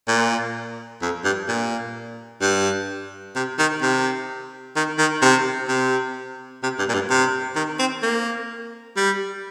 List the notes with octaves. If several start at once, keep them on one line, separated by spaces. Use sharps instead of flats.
A#2
F2
G2
A#2
G2
C3
D#3
C3
D#3
D#3
C3
C3
C3
G2
A#2
G2
C3
D#3
C4
A#3
G3